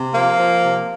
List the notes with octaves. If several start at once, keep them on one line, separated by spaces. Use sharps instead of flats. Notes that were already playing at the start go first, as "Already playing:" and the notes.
Already playing: C3
F3 A#3
F3
C3